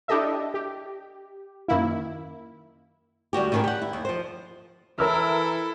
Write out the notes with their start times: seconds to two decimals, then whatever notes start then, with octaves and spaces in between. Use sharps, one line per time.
0.08 D4 E4 G4 A4 D#5 E5
0.54 G4
1.68 F#2 D#3 A#3 E4
3.33 D2 G3 F#4 G4
3.52 A2 D#3 C#4
3.64 G4 F#5
3.82 E4
3.93 D#2
4.05 F3 C5
4.99 E3 E4 A4 A#4 E6 F6